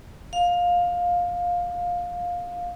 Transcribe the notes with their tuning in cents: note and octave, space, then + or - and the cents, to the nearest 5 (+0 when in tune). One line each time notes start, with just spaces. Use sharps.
F5 +15